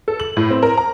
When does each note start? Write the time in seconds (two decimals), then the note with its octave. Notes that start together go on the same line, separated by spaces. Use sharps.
0.08 A4
0.20 F#7
0.37 A2
0.50 C4
0.63 A#4
0.77 A#5